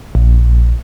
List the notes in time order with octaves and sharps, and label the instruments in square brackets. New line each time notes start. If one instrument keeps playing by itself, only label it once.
[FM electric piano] A#1